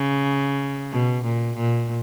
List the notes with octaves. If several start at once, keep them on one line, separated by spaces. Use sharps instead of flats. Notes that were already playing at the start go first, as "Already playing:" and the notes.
Already playing: C#3
B2
A#2
A#2